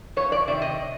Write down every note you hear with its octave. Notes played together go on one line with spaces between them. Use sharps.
F2 C#5
D5
C3 D#3 D5
D#5